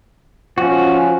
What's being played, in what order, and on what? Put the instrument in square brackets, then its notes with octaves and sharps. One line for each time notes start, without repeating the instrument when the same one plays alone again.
[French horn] F3 [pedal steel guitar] C#4 F#4